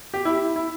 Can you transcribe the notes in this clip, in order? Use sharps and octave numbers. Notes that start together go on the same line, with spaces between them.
G4
E4
E4